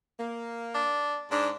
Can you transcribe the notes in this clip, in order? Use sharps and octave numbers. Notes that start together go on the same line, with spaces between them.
A#3
D4
G#2 D4